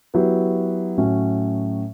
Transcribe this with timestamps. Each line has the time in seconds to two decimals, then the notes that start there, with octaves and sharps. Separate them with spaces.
0.14 F#3 B3 E4 G4
0.98 A2 F#3 C#4